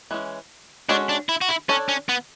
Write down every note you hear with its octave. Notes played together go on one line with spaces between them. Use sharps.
E3 G#3 C#4
G#3 C#4 D4 F#4 A4
D4
E4
F#4
E4
C#4 D4 A4 C#5
C#4
B3